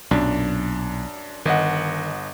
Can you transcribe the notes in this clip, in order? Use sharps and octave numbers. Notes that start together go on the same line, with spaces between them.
B1 F#2 A#2 D4
G1 D#3 D#5 F#5